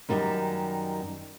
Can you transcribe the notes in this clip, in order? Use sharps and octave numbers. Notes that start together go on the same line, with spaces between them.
F#2 D#3 G3 G4